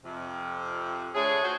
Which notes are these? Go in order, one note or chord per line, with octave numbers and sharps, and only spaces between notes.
F2 C3
D3 A3 G#4 C#5
F#4 C5